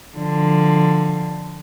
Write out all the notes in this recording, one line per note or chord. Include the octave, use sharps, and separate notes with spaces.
D3 F3